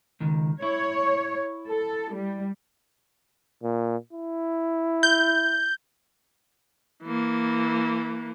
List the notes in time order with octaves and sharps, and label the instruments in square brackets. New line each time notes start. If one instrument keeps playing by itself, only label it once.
[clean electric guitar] C#2 D#3
[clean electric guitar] E4 [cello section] C#5
[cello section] A4
G3
[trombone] A#2
E4
[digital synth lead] G6
[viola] E3 A#3